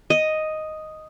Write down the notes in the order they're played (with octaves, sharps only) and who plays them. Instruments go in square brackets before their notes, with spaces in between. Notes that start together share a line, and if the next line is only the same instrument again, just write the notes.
[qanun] D#5